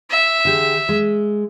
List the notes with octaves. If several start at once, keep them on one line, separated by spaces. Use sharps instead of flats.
E5
D3 G4 G#4
G#3